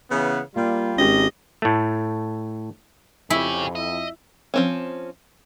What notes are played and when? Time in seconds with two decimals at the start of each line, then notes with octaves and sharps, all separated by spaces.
0.11 C#3 E3 B3
0.56 G3 A#3 F4
0.98 G#1 C#4 G4 D#5
1.62 A2 A3
3.30 F2 E4 G4 G#4 C#5
3.75 D#5 E5
4.54 F3 C4 C#4